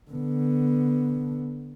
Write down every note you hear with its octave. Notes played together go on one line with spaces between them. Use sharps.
D3 B3